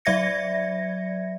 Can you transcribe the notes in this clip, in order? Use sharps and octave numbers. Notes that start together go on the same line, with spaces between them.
F#3 D5 E5 G#6 A#6 C#7